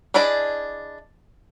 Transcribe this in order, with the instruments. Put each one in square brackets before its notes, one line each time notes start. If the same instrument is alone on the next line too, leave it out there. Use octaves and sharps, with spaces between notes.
[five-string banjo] D4 E4 G#4 D5 D#5